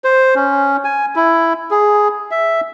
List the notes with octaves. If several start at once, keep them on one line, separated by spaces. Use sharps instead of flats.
C5
C#4
G#5
E4
G#4
E5